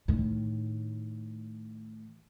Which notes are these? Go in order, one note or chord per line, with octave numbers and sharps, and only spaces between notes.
A2 D#3